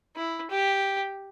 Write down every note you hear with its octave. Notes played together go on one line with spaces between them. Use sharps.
E4
G4